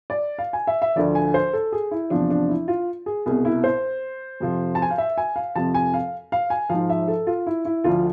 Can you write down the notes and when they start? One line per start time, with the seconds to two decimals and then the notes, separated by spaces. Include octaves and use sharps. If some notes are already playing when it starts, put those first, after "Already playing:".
0.10 D5
0.38 F5
0.53 G#5
0.67 E5
0.82 E5
0.96 D2 D3 F3 D5
1.15 G#5
1.34 C5
1.53 A4
1.72 G#4
1.91 E4
2.10 E2 C3 F3 D4
2.30 D4
2.49 E4
2.68 F4
3.06 G#4
3.26 C2 B2 G#4
3.45 E4
3.64 C5
4.40 F2 C3 F3
4.75 A5
4.82 G#5
4.91 F5
4.98 E5
5.17 G#5
5.36 F5
5.56 F2 C3 F3 A5
5.74 G#5
5.94 F5
6.32 F5
6.50 G#5
6.69 G#2 F3 F5
6.90 E5
7.08 A4
7.27 F4
7.47 E4
7.65 E4
7.84 D2 D3 F3 F4